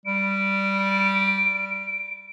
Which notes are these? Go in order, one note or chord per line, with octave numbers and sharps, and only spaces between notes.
G3 D7